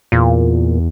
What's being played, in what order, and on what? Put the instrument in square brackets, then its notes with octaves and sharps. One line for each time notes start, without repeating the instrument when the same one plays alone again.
[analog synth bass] E2 [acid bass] A#2